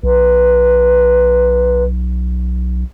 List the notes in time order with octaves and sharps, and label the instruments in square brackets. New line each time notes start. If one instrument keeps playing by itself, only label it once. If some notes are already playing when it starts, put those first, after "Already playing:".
[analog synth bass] B1 [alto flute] B4